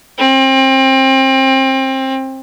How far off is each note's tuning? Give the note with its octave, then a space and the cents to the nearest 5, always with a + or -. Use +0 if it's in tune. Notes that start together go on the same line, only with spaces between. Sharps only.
C4 +30